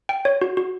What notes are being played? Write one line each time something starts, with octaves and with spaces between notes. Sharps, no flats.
G5
C#5
F#4
F#4